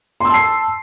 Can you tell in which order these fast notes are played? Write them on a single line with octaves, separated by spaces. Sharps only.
C6 E6 A5 C7